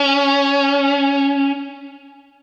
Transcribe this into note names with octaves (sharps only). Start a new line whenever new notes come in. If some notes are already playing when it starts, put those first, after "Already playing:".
Already playing: C#4